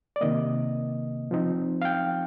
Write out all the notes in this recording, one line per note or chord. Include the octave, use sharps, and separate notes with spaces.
D5
C3 D#3 A#3 D#5
F3 C4 D#4
F5
G5